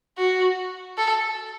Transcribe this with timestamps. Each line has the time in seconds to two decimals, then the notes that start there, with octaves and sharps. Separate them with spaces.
0.18 F#4
0.98 A4